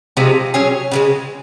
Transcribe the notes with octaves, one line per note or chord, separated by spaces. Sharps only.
C3 F3 G#3 D#4
F#3 C#4 G#4 C#5
C#3 F3 G#3